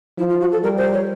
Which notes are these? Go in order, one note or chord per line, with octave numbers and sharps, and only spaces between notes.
F3 E4
F4
F#4
A4
G3 A#4
C5
C#5